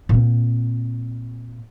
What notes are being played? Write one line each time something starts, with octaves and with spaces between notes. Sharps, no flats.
A#2 C4